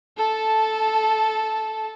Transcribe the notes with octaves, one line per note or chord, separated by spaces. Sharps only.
A4 A5